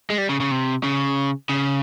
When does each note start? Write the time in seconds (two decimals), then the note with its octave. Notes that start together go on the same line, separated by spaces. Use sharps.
0.10 G#3
0.18 G3
0.29 C#3
0.40 C#3
0.51 C3
0.83 C#3
1.49 C#3